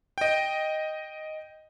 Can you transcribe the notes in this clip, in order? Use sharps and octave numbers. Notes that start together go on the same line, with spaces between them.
D#5 G5